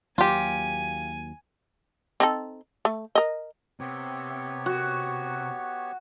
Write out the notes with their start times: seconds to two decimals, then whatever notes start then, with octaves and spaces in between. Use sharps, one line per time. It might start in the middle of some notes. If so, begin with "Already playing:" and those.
0.18 D#2 F#3 A#3 F4 G4 G#5
2.20 C4 D#4 A4
2.85 A3
3.15 A#4 D#5
3.80 C3 B3 G4 C#5
4.66 F#4